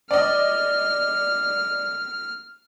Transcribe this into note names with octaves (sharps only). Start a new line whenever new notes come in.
D5 D#5 F6